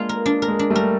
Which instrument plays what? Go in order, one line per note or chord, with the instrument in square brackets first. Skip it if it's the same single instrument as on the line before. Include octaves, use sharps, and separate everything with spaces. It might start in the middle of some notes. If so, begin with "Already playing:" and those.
Already playing: [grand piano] G#3 A#3 [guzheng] D4 F4
[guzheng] A#4
D4
A#4
[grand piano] G#3
[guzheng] D4
[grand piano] G3 A3
[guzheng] A#4